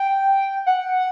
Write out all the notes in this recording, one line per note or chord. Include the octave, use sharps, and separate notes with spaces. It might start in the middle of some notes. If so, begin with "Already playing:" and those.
Already playing: G5
F#5